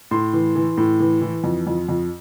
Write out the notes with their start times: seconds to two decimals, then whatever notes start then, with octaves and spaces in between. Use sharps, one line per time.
0.11 A2 C6
0.33 E3
0.56 E3
0.77 A2
1.00 E3
1.21 E3
1.44 F2
1.67 F2
1.88 F2